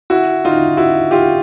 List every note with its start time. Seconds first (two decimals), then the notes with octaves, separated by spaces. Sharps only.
0.10 E4 F#4
0.45 D#4 F4
0.77 E4 F#4
1.11 F4 G4